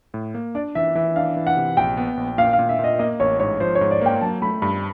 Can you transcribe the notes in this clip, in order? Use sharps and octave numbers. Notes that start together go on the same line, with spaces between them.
A2
A#3
D4 D5
E3 E5
E3 E5
D4 F5
E3
F#5
C3
A#1 G5
B3
A#1
A#2 F5
F5
A#2
E5
A#2
D#5
A#3 D#5
A1 C#5
G#2 C#5
F3 C5
C#5
G#2
D5
A#3 G5
F#3 A5
A3 B5
G2 B5